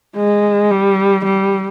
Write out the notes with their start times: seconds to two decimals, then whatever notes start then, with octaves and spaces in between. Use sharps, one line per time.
0.16 G#3
0.71 G3
1.25 G3